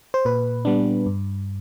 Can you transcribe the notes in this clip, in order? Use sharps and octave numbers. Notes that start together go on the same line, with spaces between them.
C5
A#2 B4
G3 B3 D4
G2